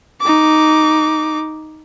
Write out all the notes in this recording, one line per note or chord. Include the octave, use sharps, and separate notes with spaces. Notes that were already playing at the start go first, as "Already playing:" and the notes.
D#4 D6